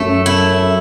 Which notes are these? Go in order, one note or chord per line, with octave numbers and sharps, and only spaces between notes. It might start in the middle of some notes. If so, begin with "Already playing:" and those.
Already playing: F#2 A3
E4